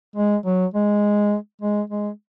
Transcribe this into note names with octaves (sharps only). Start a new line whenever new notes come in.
G#3
F#3
G#3
G#3
G#3